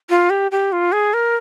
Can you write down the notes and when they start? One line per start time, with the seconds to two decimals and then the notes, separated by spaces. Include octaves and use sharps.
0.10 F4
0.30 G4
0.51 G4
0.72 F4
0.92 G#4
1.14 A#4